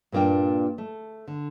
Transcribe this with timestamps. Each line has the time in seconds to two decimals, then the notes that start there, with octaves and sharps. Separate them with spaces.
0.12 G2 A#2 A#3 D4 G5
0.78 A3
1.28 D3